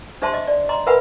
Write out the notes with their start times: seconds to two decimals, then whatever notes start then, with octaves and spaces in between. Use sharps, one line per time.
0.22 D4 G4 C5 E5 A5 C6
0.34 D#5 E5
0.47 D5
0.69 D#5 A#5 C6
0.87 A#4 B4 E5 F#5 G#5 B5